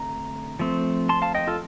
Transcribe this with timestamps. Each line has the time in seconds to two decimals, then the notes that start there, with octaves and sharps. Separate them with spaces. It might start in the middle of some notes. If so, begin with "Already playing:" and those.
Already playing: D3 A3 C4 A#5
0.59 F3 A3 C4
1.09 A5 C6
1.22 F5 A5
1.35 D#5 G5
1.47 F4 A4